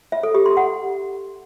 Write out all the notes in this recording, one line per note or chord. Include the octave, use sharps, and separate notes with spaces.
E5
A4
G4
C6
F#5